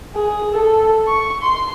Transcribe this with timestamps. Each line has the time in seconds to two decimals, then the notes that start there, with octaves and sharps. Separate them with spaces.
0.15 G#4
0.54 A4
1.07 C#6
1.42 C6